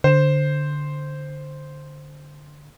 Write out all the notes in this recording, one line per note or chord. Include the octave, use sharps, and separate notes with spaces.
D3 C5 E7